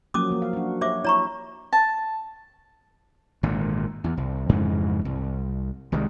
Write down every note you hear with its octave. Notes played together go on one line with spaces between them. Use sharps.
F3 F#3 A#3 C#4 D6 D#6
F3 A#3
F5
D4 F#4
G4 C5 C#5 E5 D6
E4 C#5 A#5 C#6
A5
G#1 A#2 D3
E2
C2
F2 G#2 C#3 E3
C2
C2 D#3 G3 G#3